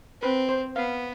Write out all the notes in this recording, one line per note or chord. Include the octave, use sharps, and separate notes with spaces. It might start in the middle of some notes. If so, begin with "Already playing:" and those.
C4 B4
C5
B3 F5